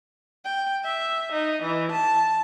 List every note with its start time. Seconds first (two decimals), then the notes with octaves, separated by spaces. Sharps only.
0.45 G5
0.84 E5
1.32 D#4
1.63 E3
1.92 A5